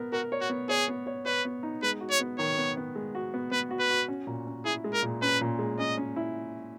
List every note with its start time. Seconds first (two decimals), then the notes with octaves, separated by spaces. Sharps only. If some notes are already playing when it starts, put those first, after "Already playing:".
Already playing: B3 A#4
0.12 F#4 A#4
0.32 C#5
0.41 F#4
0.50 B3
0.69 G#4 C#5
0.88 B3
1.06 C#5
1.26 B4 C#5
1.45 B3
1.63 D#4
1.82 G#3 B4
2.00 F#4
2.11 C#5
2.20 B3
2.39 D#3 C#5
2.58 B3
2.77 B3
2.96 G#3
3.15 F#4
3.34 B3
3.51 B3 B4
3.71 F#4
3.80 B4
3.90 F#4
4.08 C#4
4.27 A#2
4.47 C#4
4.65 E4 G#4
4.84 G#3
4.93 A#4
5.03 A#2
5.22 C#4 B4
5.41 A#2
5.59 G#3
5.78 C#4 D#5
5.97 C#4
6.16 E4